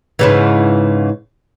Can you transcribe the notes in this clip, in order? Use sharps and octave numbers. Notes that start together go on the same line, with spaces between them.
G#2 C#3 E3